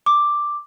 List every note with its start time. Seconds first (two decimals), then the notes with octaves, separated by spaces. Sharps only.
0.06 D6